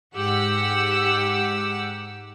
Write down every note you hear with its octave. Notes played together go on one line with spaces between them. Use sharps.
G#2 G4 F#5 E6